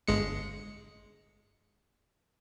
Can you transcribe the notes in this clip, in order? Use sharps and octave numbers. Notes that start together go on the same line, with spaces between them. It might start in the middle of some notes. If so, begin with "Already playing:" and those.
G1 G#3 C#7